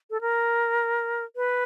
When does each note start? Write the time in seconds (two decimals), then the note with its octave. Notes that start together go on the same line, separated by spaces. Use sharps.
0.11 A4
0.21 A#4
1.36 B4